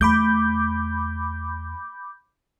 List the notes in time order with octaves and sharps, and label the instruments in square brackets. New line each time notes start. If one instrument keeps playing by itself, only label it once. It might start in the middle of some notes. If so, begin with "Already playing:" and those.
[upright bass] E2 A3 [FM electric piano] B5 D6 G6